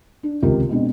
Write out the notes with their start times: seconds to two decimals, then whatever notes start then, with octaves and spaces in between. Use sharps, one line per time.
0.23 D4
0.42 D#1 C#2 C3 F4 G4 A#4
0.69 B2 G#3 C4 D4